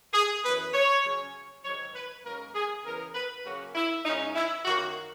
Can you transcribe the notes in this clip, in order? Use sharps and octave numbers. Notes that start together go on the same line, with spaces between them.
G#4
F#2 E3 B3 B4
C#5
C#3 F#3 C#4
G#2 D#3 F#3 C#5
B4
G#2 F#3 A#3 C#4 A#4
G#4
C#3 E3 B3 A#4
B4
C#3 F#3 A#3 C#4 F#4
E4
A#2 G#3 C#4 D#4
E4
F#2 D#3 A#3 F#4